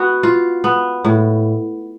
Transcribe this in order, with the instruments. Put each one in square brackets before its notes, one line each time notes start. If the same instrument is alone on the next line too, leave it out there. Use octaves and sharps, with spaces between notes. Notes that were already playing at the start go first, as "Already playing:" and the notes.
Already playing: [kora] B3 F#4
F4
B3
A2